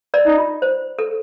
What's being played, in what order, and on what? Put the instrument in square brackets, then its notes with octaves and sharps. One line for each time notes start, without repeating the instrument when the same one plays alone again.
[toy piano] A#4 D5
[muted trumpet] D#4
[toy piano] F4
C5
A4